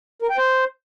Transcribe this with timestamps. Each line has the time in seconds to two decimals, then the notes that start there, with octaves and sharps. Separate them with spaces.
0.22 A#4
0.30 G5
0.37 C5